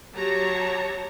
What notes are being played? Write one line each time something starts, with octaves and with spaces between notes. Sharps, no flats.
F#3 G4 C#5 A5 A#5